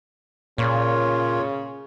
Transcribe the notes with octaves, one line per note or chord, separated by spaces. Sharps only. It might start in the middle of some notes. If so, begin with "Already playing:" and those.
A#2 C#3 F4 C#5